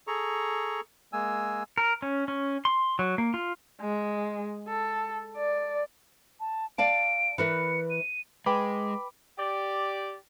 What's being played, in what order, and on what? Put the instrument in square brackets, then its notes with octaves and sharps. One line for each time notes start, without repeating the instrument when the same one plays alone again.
[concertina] G#4 A4 A#5 C#6
G#3 A#3 G#5 E6
[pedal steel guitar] A#4
C#4
C#4
C6
F#3
A#3
F4
[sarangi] G#3
A4
D5
[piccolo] A5
[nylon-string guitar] D5 F5 A5 [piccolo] D7
[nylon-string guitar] E3 A#4 B4 [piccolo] C#7
[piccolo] D#7
[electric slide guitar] G#3 [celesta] B4 G5 [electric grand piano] B5 D6
[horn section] G4 D5